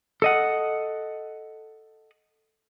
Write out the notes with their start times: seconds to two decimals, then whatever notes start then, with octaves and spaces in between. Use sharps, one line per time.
0.22 A4 D#5 F#5